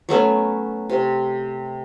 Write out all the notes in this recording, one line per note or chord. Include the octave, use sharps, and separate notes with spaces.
F#3 A3 B3 C#4
C3